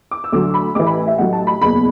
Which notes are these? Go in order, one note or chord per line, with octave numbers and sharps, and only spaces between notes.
D6
E6
D2 D3 F#3 D6
B5
A1 A2 E3 D6
B5
E5
A1 A2 F#3 F#5
A5
B5
F#1 E2 B2 B5